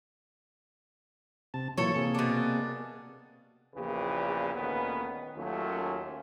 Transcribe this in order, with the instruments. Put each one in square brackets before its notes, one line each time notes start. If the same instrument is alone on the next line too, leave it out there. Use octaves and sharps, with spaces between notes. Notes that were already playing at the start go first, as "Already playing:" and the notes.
[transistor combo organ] C3 A5
[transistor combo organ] A#2 E3 F#3 [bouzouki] A4 C#5
[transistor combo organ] C3 A#3 G#4
[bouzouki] B2 D4
[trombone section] A#1 E2 A#2 C#3 G4 B4
D2 A#2 D#3 B3 C#4 B4
D#2 D#3 F#3 A3 C#4 F4